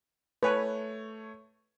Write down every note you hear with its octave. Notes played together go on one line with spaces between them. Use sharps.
A3 B4 C#5 G#5